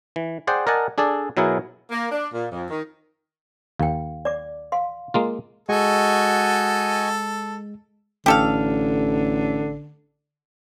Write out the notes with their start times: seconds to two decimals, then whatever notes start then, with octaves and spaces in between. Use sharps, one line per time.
0.16 E3
0.47 G#4 C5 D5 F#5 G5
0.67 A#4 D5 D#5 F#5 G#5 A5
0.98 D4 G#4 A4 D5
1.37 B2 F#3 E4 G#4 A#4
1.91 A#3
2.12 D4
2.33 A#2
2.51 F2
2.70 D#3
3.79 D#2 F5 G5
4.25 D5 D6
4.72 F5 C6
5.14 G#3 A#3 F4
5.69 G#3 F#4 A4 D#5 G#5 C#6
8.26 A1 D3 G4 A4 F5